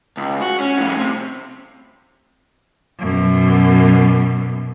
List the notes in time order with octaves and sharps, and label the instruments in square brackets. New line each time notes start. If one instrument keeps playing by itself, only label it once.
[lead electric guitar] C#2
F#4
C#4
F2 A2
C3
[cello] F#2 B2